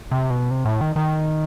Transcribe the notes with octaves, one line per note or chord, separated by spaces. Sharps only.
C3
B2
C3
A2
D#3
D#3